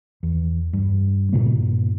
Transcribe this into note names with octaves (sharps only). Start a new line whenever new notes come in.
E2
G2
G2 A#2 C#3 A#3